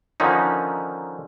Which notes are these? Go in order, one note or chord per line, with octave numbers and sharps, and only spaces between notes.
D3 D#3 F3 C#4 D#4